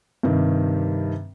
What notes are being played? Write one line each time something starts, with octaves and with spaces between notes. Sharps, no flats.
G2 C3 D#3